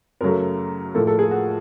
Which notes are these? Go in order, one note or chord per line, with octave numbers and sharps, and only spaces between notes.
F#2 C#3 F#3 A3 A#4
A2 F3 A#3 A4
A4
G#4
F#4